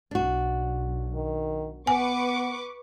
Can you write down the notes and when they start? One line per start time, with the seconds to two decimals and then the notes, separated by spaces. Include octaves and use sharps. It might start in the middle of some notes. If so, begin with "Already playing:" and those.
0.11 B1 D4 F#4
1.14 D#3
1.87 B3 B4 G#5 C#6 D6